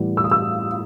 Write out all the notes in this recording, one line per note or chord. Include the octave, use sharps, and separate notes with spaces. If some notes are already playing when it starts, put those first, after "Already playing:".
Already playing: A2 E3 G3 B3
E6
D#6
E6